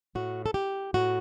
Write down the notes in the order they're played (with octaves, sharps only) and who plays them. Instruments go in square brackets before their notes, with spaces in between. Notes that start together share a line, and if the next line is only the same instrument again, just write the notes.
[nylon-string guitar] A2 F#4
A4
G4
A2 F#4